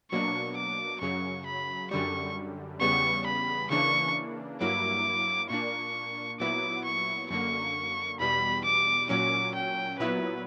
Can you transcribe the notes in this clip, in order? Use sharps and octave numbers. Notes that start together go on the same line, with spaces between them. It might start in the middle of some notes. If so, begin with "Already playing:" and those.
B2 F#3 A#3 D4 C#6
D6
F#2 C#3 F#3 C#6
B5
F#2 D3 G3 C#6
E2 C#3 G3 B3 C#6
B5
C#3 E3 A#3 D4 C#6
G2 F#3 A#3 E4 D6
A#2 A#3 D4 C#6
A#2 F#3 B3 E4 D6
C#6
F#2 D3 A#3 C#6
E2 B2 G3 B5
D6
A#2 F#3 C#4 D6
G5
A#2 F#3 B3 E4 B4